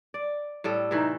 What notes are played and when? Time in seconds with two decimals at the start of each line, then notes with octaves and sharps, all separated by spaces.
0.14 D5
0.64 A2 G3 A4
0.91 C3 E3 A3 D#4